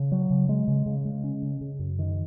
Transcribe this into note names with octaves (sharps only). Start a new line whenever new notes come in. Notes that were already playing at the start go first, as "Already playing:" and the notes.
Already playing: C#3
F#3
C#3
G#3
C#3
C#3
G#3
C#4
C#3
C#3
F#2
D#3